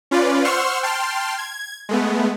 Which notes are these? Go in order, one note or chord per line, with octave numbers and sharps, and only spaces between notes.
C#4 F4 B4 D5
C5 F#5 C6 C#6 E6 F6
G5 A5 C6 F6
G#6
G#3 A3 B3